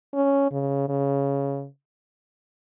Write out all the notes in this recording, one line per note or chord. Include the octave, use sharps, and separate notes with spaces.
C#4
C#3
C#3